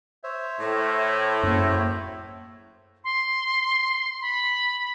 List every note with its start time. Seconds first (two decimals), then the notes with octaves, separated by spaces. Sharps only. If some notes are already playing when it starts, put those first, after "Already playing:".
0.24 C5 C#5 E5
0.60 A2
1.43 F#2 A#3
3.04 C6
4.21 B5